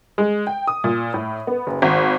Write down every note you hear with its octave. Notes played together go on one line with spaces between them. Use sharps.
G#3
G5
D#6
A#2
A2
B3
F#1
G#1